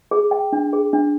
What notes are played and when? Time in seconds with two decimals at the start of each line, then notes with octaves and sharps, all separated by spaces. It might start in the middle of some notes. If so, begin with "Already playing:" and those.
0.11 G#4
0.31 G5
0.53 D4
0.73 G#4
0.93 D4